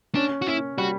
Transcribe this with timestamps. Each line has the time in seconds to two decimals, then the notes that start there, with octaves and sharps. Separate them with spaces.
0.15 C#4 D4
0.42 F#4
0.47 C#4 E4
0.78 G3 F#4